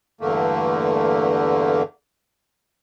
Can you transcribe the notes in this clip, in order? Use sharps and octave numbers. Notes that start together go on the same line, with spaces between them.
E2 G2 D3 A3 A#3